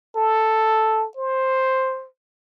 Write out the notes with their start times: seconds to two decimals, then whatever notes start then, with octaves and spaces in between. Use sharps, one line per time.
0.16 A4
1.17 C5